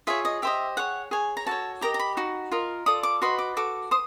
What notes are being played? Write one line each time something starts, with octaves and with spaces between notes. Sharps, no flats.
F4 G#4 C#5 E5
D#5
G4 C5 D#5 E5
G#4 C#5 F#5
G#4 C#5 G#5
A#5
F#4 A4 C#5 A5
G4 A#4 D#5 A#5
A#5
B5
D#4 F#4
F4 A#4 D#5
F4 A4 D5 D#6
D6
F#4 B4 D#5 C6
D6
F#4 A4 D6
C5 D#6